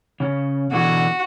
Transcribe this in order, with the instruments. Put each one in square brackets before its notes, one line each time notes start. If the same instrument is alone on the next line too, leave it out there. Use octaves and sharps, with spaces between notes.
[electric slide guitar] C#3 C#4
[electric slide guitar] B2 D3 E3 [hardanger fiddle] F#4